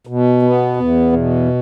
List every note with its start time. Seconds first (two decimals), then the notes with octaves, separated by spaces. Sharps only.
0.07 B2
0.42 B3
0.76 E2
1.13 B2